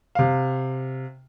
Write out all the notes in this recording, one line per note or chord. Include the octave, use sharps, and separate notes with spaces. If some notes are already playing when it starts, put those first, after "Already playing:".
C3 F5